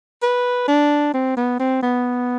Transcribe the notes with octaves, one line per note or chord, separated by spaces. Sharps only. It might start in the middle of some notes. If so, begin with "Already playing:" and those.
B4
D4
C4
B3
C4
B3